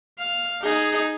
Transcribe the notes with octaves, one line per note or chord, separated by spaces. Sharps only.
F5
D#4 G#4